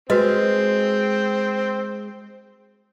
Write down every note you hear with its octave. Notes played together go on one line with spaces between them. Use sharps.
G#3 C4 F#4 B4 D#5